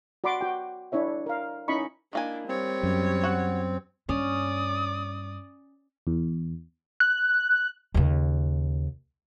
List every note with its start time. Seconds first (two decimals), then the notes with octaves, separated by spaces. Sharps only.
0.24 F#4 D5 B5 C6 D6
0.41 F#4 G5
0.92 D4 E4 C#5 E5
1.26 A#4 F5
1.68 C#4 D#4 E4 D#5 B5 C#6
2.13 D#3 A#3 D4 E4 G#5
2.48 G3 C4 C#5
2.83 F#2
3.24 F#4 F#5
4.09 G2 A#3 C#4 D5 D#6
6.07 E2
7.00 F#6
7.94 D#2 C#3